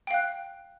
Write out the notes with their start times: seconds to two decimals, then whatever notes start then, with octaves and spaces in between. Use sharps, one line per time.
0.07 G5
0.11 F5
0.14 F#6